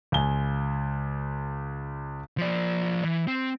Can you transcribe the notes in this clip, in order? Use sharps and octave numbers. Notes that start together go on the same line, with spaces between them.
C#2 G#5 G7
F3 D5
E3
C4